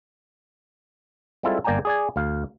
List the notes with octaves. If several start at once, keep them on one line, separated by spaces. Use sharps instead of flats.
G3 G#3 C4 E4 F4 A4
G1 A#3 D5 G5 G#5 A#5
G#4 D5 G#5
D2 F5